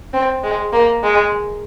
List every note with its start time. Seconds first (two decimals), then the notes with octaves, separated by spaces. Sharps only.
0.13 C4
0.43 G#3
0.72 A#3
1.03 G#3